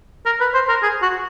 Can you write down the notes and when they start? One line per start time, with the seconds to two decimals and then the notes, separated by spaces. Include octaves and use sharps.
0.26 A#4
0.40 B4
0.54 C5
0.69 A#4
0.82 G#4
1.02 F#4